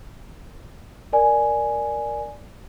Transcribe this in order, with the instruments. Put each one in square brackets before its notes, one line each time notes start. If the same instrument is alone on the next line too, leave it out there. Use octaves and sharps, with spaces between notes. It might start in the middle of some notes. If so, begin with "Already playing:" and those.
[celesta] A#4 D5 G#5